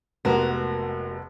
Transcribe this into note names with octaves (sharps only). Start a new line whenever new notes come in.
F1 G#3 A#3 B3 F#4 A#4